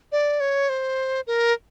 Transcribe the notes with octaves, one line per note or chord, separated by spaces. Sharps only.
D5
C#5
C5
A#4